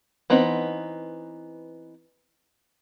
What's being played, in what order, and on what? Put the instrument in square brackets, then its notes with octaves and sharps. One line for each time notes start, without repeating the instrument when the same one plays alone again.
[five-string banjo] E3 B3 C4 D#4